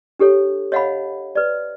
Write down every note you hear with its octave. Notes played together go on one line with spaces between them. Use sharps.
D4 G4 A4 C#5
C#5 D#5 F5 F#5 G#5 B5
B4 D5